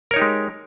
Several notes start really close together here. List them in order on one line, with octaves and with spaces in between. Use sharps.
A#4 C#5 D#4 G4 G#3